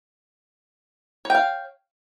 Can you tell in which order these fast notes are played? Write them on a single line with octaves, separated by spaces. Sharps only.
C#5 G5 F5